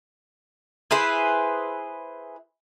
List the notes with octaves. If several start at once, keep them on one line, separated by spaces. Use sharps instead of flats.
E4 G#4 B4 C5